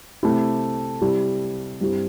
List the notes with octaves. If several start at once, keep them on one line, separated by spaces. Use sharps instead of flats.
C3 A3 E4 G4
C3 G3 E4 G4
G2 G3 C4 E4 G4